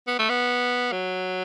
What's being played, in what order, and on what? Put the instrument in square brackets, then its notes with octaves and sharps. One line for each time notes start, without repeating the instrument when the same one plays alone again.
[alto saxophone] B3
A3
B3
F#3